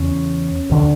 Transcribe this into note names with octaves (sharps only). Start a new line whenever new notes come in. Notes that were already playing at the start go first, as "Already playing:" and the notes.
Already playing: E2 C#3 C#4
D2 D3